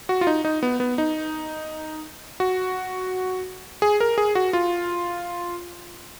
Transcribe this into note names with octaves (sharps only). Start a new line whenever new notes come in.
F#4
F4
D#4
D#4
B3
B3
D#4
F#4
G#4
A#4
G#4
F#4
F4